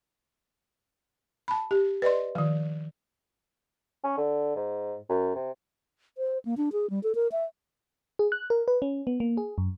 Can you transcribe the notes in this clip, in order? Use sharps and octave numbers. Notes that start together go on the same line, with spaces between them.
A5 B5
G4
B4 D5 D#5 C6
D#3 F3
C#4
D3
G#2
F#2
C3
C5
A#3
D4
G#4
G3
A4
A#4
E5
G#4
F#6
A#4
B4
C#4
B3
A#3
G#4
F#2